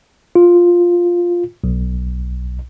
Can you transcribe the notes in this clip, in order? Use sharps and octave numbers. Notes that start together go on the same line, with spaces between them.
F4
B1